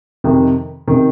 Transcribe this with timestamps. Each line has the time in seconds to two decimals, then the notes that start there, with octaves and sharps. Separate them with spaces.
0.24 F2 C3 D#3
0.88 C3 D#3